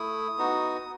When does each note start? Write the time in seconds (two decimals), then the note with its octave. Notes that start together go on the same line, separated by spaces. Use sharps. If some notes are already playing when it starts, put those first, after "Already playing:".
Already playing: A3 E4 D#6
0.38 B3 D#4 F#4